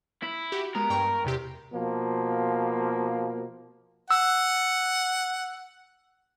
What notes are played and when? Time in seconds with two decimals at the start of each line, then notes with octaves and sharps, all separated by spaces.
0.23 E4
0.52 F#4 G4
0.75 G#3 B3 A#4
0.90 G2 G5 C#6
1.24 E2 C3 G4
1.72 B2 F3 A#3
4.11 F#5 E6